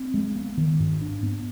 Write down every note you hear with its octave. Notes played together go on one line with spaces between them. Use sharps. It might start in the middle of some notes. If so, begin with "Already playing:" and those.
Already playing: C4
G#3
B3
D#3
G#2
D4
B3